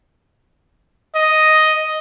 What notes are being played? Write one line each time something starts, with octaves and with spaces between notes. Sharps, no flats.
D#5